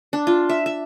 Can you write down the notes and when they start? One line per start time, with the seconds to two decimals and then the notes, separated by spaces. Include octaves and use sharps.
0.13 D4
0.27 F4
0.49 E5
0.66 E5